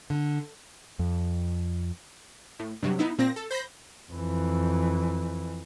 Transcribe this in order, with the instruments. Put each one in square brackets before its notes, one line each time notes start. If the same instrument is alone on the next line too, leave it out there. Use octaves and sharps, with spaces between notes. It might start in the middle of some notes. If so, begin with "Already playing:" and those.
[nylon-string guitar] D3
[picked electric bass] F2
[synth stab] A2
G2 C3 F#3
B3 D#4 E4
A#2 C4 A#6
A4
C5 B5 G6 A#6
[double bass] F2 E3